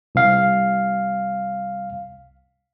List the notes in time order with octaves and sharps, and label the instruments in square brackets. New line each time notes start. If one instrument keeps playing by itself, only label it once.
[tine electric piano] C2 F5